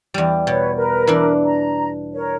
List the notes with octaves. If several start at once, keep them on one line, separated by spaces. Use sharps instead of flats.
E2 G3
B2 B4 C#5
A#4 B4
E3 D4
A#5
A#4 C#5